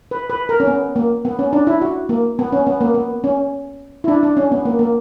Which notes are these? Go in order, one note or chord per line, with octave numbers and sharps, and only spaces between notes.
B4
B4
A#4
C#4
B3
A#3
B3
C#4
D4
E4
F#4
A#3
B3
C#4
B3
A#3
B3
C#4
E4
D4
D4
C#4
B3
A#3
A#3